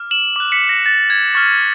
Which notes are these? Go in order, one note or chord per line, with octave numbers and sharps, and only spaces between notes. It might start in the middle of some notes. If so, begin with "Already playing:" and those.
Already playing: D6 F6
E7 F#7
D6 F#6
B6 C#7
A#6
A6
G#6
C#6 F6 A6